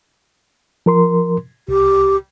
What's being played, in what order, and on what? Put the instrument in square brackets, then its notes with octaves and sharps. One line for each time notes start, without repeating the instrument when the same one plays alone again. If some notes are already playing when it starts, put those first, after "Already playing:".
[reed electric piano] F3 A#4 C6
[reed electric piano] C2 [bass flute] G4